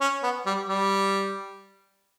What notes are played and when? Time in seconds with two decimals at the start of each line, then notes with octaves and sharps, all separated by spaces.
0.01 C#4
0.23 B3
0.46 G3
0.68 G3